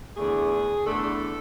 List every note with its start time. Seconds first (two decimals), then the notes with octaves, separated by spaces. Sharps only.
0.17 E2 D3 A3 D4 G#4
0.85 E2 D3 A3 D4 A4